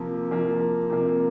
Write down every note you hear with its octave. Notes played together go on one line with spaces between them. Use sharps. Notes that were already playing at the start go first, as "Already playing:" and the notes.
Already playing: C3 F3 A#3
C3 F3 A#3
C3 F3 A#3